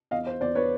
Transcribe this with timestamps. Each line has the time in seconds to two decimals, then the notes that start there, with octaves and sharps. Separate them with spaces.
0.11 E2 D#5 F5
0.27 C5
0.41 E2 C5 D5
0.55 B4 C#5